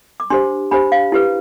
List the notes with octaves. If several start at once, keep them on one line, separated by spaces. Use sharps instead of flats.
D6
D4 G4 C5 C6
D4 G4 C5 B5
F5
E4 G4 B4